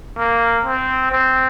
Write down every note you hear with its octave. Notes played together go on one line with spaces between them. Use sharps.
A#3
C4
C4